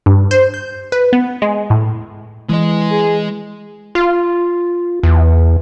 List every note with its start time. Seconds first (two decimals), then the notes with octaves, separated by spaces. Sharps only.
0.06 G2
0.31 C5
0.54 G6
0.92 B4
1.13 B3
1.42 G#3
1.70 A2
2.50 E3 G#3 D#5
2.91 G#4
3.95 F4
5.03 E2